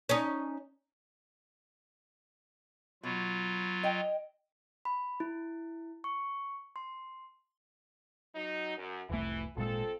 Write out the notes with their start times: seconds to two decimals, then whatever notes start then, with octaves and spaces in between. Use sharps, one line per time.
0.09 C#4 D#4
3.03 B2 F#3 F4
3.83 D#5 G5
4.85 B5
5.20 E4
6.04 C#6
6.76 C6
8.35 F#3 D#4
8.77 F#2
9.09 F1 C2 E3 A3
9.56 G#1 A#2 G#3 C4 F4 A4